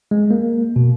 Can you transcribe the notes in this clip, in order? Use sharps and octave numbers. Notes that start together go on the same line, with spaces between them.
G#3
A#3
B2